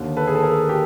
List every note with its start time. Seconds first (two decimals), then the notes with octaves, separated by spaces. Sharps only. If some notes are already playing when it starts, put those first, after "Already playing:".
Already playing: D#2 D3
0.17 A4 B4
0.27 G#4
0.35 A4
0.43 G#4 A#4
0.69 G4 A4